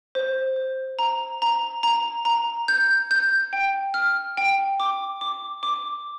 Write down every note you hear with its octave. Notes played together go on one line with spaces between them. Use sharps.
C5
C5
A#5
A#5
A#5
A#5
G6
G6
G5
F6
G5
D6
D6
D6